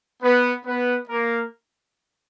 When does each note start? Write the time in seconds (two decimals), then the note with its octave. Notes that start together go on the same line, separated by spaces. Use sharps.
0.22 B3 B4
0.65 B3 B4
1.08 A#3 A#4